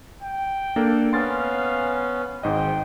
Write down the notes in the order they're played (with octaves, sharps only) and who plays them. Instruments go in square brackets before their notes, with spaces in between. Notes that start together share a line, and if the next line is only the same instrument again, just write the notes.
[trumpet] G5
[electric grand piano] A#3 D4 A4
[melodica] B3 C#4 [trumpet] F5 [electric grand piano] C6 A6
[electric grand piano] G#1 G#2 D#5 [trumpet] G5